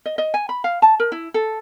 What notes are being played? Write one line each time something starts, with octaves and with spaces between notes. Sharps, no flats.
D#5
D#5
G#5
B5
F5
A5
A#4
E4
A4